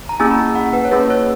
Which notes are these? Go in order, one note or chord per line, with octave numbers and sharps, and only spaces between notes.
A#5
A#3 C#4 E4 G#4 G#5
B5
A#5
F#5
B4
C#5
A#3 C#4 E4 G#4 B4
C#5